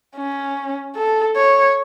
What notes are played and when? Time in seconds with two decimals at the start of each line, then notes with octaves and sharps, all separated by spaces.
0.16 C#4
0.96 A4
1.36 C#5